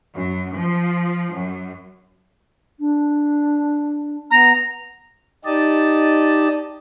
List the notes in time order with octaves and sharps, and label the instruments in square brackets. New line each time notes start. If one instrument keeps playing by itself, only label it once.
[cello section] F#2
F3
F#2
[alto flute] D4
[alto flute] B3 [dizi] A#5
[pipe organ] D#4 G4 D5 D#5 A5